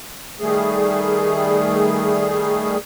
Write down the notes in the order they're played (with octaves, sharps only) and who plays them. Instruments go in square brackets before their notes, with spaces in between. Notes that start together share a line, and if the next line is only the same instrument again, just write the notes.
[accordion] D#3 G3 A3 G#4